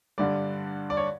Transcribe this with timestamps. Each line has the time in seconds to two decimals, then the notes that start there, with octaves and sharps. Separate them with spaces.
0.18 G2 D3 G3 D5
0.90 D5
0.97 C#5